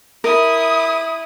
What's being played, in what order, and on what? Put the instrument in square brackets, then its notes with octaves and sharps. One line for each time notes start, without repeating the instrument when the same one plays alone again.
[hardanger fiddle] E4 [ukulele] A#4 [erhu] D#6